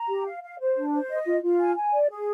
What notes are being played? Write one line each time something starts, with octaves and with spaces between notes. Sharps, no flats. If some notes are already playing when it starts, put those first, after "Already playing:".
Already playing: A#5
G4
F5
F5
C5
D4
C5
D#5
F4
F4
G#5
G#5
D5
G#4